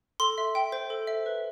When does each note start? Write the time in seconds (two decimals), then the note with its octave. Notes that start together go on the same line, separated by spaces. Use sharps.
0.20 A4 C6
0.38 E5
0.55 G5
0.72 C5
0.90 A4
1.07 E5
1.26 B4